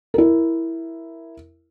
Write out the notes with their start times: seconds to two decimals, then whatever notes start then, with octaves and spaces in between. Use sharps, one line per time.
0.14 E4 A#4